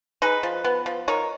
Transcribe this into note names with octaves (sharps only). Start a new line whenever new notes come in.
D#4 G#4 B4
F3
B3
F3
D#4 A#4 C#5